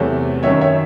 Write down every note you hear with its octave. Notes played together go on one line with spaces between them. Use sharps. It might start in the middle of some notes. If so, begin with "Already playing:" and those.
Already playing: E2 C3 F#3 A3
F#2 D#3 F#3 C#5 E5
C#5 E5